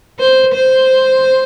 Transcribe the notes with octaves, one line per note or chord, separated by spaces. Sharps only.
C5
C5